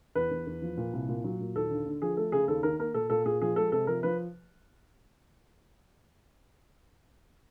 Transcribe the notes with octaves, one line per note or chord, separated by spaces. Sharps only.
E2 B4
E2
E2
F3
A#2
C2
A#2
F#3
A#2
D#2 A4
D3
D3
F3 G#4
A3 A4
C#3 G#4
D#2 A4
D#3 A#4
A#3 A#4
A#2 A4
A#2 A4
A#2 G#4
F3 G#4
G#3 A4
C3 A4
F3 A#4
F3 B4